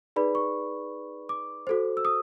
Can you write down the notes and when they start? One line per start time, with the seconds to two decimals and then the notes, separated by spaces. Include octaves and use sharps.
0.16 D#4 G#4 B4 D5 B5
0.35 C#6
1.29 D6
1.67 F#4 A4 C5
1.97 E6
2.05 D#6